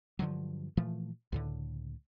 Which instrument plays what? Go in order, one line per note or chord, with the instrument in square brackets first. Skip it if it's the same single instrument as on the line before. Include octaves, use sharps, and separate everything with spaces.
[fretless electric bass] G2 D3 F3 F#3
A#2 E3 F3 A3
C#2 A2 D3